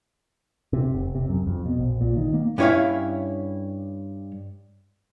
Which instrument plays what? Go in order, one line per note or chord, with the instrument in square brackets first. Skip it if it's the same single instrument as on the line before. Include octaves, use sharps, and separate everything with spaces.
[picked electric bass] C3
F1
C3
F#2
F2
B2
A#1
A#2
D#3
A#3
[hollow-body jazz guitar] G2 C#4 E4 C#5 E5 F5